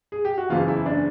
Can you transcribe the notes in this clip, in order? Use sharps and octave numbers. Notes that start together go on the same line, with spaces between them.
G#4
G4
F#4
F#1 E2 C#3 E3 F4
F4
E4
D4